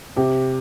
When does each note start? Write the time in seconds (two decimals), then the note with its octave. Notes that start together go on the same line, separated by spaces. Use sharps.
0.16 C3 G4